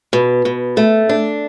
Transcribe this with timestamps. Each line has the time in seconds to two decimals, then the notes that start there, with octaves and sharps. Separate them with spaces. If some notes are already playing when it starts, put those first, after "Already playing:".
0.13 B2
0.45 B2
0.77 A3
1.09 D4